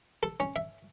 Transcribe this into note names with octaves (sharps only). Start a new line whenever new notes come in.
A4
C#4
E5